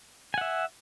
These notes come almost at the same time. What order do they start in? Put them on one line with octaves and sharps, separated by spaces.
G#5 F#5 E5